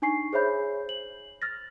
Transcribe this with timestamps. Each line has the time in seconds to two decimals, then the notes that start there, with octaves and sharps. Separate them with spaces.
0.02 D4 D#4 G#5 C#6 C7
0.33 G#4 C5 C#5 E5 B5 G6
0.89 F#7
1.42 F6 A6 A#6